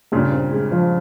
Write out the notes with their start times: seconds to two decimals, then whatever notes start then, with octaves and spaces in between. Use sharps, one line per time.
0.12 G2 A#2 C#3
0.32 C4
0.51 G#3
0.72 F3